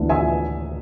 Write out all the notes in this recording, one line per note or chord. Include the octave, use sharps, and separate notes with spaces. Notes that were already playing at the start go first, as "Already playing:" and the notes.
Already playing: D2 E3 B3 D4
E5 G#5